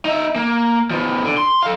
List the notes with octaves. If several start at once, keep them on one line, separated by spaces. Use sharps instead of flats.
D#4 E5
A#3
F3 B3
D3
C6
A4 F5